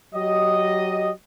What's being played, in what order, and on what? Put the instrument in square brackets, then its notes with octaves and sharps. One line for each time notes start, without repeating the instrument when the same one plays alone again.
[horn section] F#3 G4 D#5